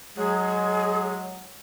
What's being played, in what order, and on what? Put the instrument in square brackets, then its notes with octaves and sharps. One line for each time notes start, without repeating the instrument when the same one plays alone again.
[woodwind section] F#3 G#3 [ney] G#4